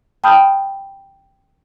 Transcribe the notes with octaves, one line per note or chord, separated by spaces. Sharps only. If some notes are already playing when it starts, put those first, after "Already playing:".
G5 A5 B5 D#6 F6 G6